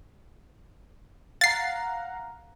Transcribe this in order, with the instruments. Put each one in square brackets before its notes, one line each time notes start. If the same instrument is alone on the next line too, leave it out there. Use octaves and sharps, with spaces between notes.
[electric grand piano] F5 F#5 A#5 [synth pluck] A6 C7